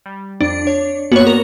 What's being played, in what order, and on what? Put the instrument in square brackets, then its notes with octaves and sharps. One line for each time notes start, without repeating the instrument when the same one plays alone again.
[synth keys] G3
[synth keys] F2 [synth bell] D4
[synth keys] C#5
[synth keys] G2 A#3 B3 [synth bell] F#4 C#5
[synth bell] A#4